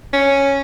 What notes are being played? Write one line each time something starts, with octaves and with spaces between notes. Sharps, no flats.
C#4